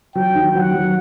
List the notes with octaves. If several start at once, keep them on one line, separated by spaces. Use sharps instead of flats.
F#3 G5
D#2
F#3 F#5
F#3